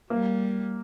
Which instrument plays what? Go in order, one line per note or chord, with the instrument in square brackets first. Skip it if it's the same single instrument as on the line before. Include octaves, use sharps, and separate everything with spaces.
[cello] G3 [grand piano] A#3